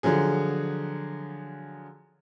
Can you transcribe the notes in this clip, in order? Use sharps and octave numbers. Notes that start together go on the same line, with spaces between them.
D3 F3 F#3 G#4